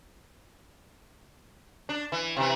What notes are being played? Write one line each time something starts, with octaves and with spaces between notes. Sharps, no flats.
D4
E3
C3 E3